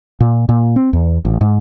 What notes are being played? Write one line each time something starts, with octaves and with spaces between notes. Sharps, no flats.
A#2
A#2
C4
E2
A1
G#2